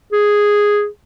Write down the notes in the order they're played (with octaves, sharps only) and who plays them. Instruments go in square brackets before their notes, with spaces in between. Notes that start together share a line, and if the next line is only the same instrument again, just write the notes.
[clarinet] G#4